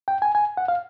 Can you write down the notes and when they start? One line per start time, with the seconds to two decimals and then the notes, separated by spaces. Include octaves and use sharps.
0.08 G5
0.22 G#5
0.35 G#5
0.57 F#5
0.68 F5